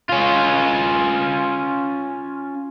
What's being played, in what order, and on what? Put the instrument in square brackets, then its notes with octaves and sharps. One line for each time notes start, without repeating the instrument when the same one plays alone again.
[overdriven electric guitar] C#4 F4